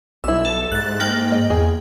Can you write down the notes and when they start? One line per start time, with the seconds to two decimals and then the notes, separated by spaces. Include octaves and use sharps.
0.24 B1 G3 E4 E6
0.45 A4
0.72 G#2 F#6 A6
1.00 A#3 G5 F#7
1.32 D#5
1.50 E2 G#4 D#5